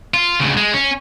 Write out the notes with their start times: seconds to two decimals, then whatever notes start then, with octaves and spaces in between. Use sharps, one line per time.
0.14 F4
0.40 D2 C#3
0.57 G#3
0.74 C#4